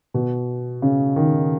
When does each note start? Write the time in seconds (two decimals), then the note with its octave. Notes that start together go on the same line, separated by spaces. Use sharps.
0.14 B2
0.82 C#3
1.16 D#3